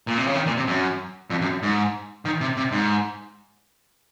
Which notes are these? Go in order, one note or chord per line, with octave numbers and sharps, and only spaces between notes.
A#2
C3
C#3
D#3
A#2
C3
F#2
F2
F#2
G#2
D#3
C3
C3
G#2